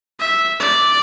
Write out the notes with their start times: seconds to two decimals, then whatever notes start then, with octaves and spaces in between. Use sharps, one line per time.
0.19 E5
0.60 D5